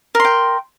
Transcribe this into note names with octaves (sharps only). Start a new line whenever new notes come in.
A#4 G5 C6